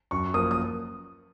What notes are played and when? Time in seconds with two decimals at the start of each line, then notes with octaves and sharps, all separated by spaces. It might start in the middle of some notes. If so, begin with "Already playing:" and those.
0.11 F#2 C#6
0.34 F3 A#3 D#6
0.51 D#6